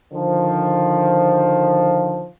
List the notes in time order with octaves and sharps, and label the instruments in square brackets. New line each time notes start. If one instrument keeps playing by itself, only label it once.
[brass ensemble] D3 D#3 F3